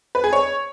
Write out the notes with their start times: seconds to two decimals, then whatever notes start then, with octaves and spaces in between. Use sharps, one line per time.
0.15 B4
0.24 G#4
0.33 C#5